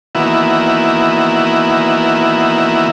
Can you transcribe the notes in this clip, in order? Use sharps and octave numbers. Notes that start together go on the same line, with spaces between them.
D#3 E3 A#3 B3 E4 F#4